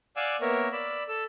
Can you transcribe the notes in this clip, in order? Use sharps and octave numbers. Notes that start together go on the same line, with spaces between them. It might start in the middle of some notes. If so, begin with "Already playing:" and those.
D5 F5 F#5 G#5 D6 E6
A#3 B3 A#4 C#5 E5
D5 B5 E6
A4 E6